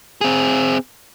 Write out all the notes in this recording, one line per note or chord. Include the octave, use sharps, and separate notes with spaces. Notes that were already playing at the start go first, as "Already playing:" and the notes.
C4 G#4